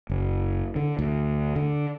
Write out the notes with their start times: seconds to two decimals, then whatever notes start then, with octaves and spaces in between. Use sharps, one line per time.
0.10 F#1
0.76 D3
0.99 D2
1.56 D3